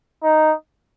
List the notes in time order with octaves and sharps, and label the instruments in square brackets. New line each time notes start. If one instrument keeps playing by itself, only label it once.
[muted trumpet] D#4